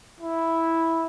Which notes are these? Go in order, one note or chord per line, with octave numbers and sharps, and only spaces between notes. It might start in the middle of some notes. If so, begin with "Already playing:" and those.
E4